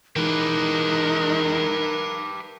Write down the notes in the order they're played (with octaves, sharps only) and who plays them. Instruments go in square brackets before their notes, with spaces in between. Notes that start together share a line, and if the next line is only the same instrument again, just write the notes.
[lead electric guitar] E3 G#3 [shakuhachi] D#4 [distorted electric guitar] G4 B4 [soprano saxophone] A#4